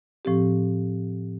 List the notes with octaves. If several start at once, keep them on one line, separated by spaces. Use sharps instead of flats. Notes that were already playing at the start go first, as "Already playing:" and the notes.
A2 F3 C4 G4